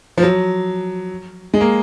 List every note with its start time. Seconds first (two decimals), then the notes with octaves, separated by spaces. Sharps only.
0.18 F3
0.23 F#3
1.54 G#3
1.61 A#3